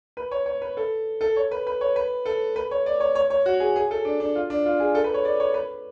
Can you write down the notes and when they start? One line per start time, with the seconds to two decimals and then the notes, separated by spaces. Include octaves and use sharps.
0.17 B4
0.31 C#5
0.46 C#5
0.62 B4
0.77 A4
1.21 A4
1.36 C#5
1.51 B4
1.67 B4
1.81 C#5
1.96 B4
2.26 A4
2.56 B4
2.71 C#5
2.86 D5
3.00 C#5
3.15 C#5
3.30 C#5
3.46 F#4
3.60 G#4
3.76 G#4
3.91 A4
4.05 D4
4.20 D4
4.35 F4
4.50 D4
4.66 F4
4.80 G#4
4.95 A4
5.04 B4
5.14 C#5
5.25 D5
5.40 C#5
5.54 B4